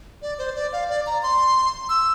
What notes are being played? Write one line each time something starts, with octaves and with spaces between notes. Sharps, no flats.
D5
C5
D5
F5
D5
A#5
C6
E6